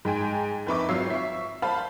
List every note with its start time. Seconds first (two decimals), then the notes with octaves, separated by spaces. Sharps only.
0.05 G#2 G5 G#5
0.67 F2 D#4 B4 E5 C#6 D6
0.89 G#1 F#3 F4 C#5 E6 C7
1.10 E5 C#6
1.62 C5 F5 A5 B5